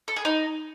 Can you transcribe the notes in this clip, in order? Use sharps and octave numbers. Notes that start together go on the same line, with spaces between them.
A4
G#4
D#4